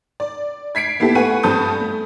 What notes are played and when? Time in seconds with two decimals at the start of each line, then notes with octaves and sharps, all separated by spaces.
0.20 D5
0.75 G#6 B6 C7 D7
1.00 A#3 B3 E4 G4 A4
1.15 A3 B4 F#5 G#5 C#6 D#7
1.43 G2 C4 A4 A5 D#6 G6
1.80 A3